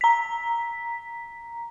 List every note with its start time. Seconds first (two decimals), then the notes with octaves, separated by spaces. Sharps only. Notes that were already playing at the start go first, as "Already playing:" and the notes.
0.01 A#5 B6